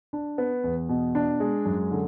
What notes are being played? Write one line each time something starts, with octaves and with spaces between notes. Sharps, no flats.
D4
B3
E2
B2
D4
G#3
F#2
D3